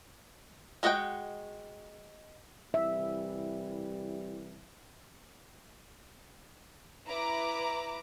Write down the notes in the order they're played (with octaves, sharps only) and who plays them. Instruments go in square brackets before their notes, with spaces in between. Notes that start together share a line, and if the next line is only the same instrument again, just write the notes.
[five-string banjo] G#3 F#4 D#5 F#5 G5
[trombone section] C2 E3 G3 [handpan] E5
[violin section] E4 B4 A#5 D6